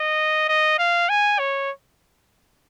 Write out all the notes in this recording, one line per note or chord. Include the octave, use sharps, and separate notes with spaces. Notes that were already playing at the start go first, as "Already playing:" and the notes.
Already playing: D#5
D#5
F5
G#5
C#5